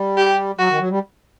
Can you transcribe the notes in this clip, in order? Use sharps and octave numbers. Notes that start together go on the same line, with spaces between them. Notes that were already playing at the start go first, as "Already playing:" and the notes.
Already playing: G3
G4
F#3 F#4
D#3
F#3
G3